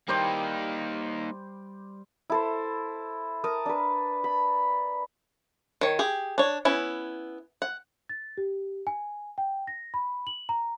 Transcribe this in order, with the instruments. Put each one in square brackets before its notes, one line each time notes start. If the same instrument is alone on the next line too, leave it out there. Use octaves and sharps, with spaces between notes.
[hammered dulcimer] G3 C5 D5 [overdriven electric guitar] A#3 D#4
[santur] E4 A4 C5
A#4 A5 A#5 D#6
D4 B4
B5
[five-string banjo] D#3 C#5
G4 G#4
D4 C#5
B3 C#4 E4
F#5
[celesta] A6
G4
G#5
G5
A#6
B5
F#7
A#5